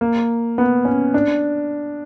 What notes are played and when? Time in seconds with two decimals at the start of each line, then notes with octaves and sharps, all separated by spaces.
0.01 A#3
0.58 B3
0.85 C#4
1.14 D4